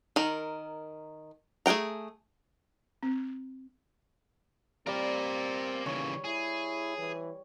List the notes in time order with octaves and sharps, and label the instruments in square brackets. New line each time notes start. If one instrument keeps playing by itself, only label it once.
[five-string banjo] D#3 A#4
A3 G#4 F#5 G5 A#5
[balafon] C4
[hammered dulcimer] G3 F5 [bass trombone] C4 [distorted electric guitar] A#4 D5
[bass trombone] D#2 [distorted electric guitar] C#3 E3 [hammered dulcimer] C#5
[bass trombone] E4 [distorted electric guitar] G#4
[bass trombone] E3